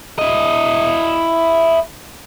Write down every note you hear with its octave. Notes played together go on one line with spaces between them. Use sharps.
E4 D#5